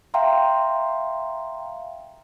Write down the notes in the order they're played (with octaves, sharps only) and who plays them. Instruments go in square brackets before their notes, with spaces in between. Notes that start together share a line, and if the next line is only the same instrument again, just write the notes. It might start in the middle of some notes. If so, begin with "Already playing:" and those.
[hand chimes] E5 F5 G5 A#5 C6